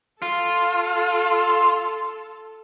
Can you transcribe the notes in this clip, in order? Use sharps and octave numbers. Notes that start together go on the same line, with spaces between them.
F4 A4